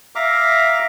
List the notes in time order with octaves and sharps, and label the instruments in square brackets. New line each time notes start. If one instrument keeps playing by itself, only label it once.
[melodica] E5 F5 A#5 D6